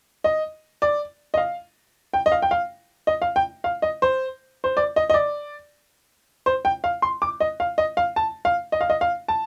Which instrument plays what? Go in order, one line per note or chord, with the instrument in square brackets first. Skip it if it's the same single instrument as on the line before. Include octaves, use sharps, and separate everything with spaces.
[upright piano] D#5
D5
D#5
F5
G5
D#5
F5
G5
F5
D#5
F5
G5
F5
D#5
C5
C5
D5
D#5
D#5
D5
C5
G5
F5
C6
D6
D#5
F5
D#5
F5
A5
F5
D#5
F5
D#5
F5
A5